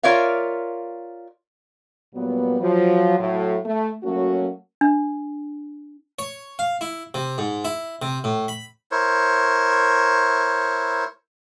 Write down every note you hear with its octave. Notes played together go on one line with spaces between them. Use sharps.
F4 A#4 C#5 D5 E5 F5
A#2 F#3 G3 B3
F3 F#3
A2 F#3
A3
F#3 A3 A#3 C#4 F#4
D4
C#5
F5
E4
C3
G#2
E4
C3
A2
B5
E4 A#4 C5 C#5